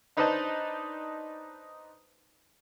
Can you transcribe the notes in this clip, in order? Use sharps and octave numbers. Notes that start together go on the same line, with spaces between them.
D4 D#4 B4 C5 D#5 A5